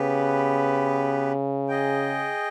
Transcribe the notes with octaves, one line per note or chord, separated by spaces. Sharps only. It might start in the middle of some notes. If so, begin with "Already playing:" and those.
Already playing: C#3 B3 G4 B4
G#4 D#5 G5